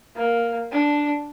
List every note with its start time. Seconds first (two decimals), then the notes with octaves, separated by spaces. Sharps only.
0.16 A#3
0.72 D4